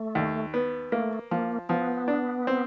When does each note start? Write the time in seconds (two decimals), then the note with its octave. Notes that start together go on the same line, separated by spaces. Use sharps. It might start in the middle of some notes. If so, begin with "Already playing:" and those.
Already playing: A3
0.15 D#2
0.54 B3
0.92 A3 A#3
1.31 F3 A#3
1.69 F3 B3
2.08 D4
2.47 C4